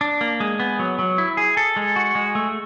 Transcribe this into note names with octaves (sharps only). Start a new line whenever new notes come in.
D4
A#3
G#3
B3
F#3
F#3
E4
G#4
A4
G#3
F#4
G#3
A3